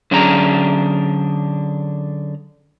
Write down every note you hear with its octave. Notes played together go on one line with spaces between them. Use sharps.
D3 F#3 C#4 D4 G#4 A#5